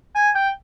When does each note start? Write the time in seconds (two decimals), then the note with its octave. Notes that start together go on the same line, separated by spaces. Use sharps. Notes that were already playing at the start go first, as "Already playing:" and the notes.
0.15 G#5
0.35 G5